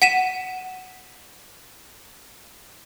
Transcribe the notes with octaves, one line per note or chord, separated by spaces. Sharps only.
F#5 B6 D#7 E7